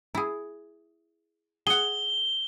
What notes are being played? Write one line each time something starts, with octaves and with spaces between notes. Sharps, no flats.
E4 G#4
G#4 F#5 G7